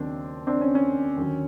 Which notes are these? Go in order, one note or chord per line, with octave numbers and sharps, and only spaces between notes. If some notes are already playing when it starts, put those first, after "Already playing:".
Already playing: D#2 C#3 F#3 A#3 C4 D4
C4 D4
C#4
C#4
D#2 D3 F#3